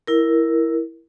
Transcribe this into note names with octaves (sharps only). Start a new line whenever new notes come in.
E4 A#4